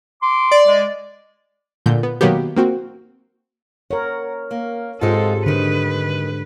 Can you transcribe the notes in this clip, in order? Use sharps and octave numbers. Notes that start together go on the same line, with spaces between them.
C6 D6
D5
G#3
A#2 D3 G6
B3
B2 D#3 F#3 A#3 B3 G4
A#3 C4 F#4
A#4 C#5 F#5
A#3
G#2 G#3 C4 D#4 F4 G4 A4
F#2 D3 D#3 B4 C#7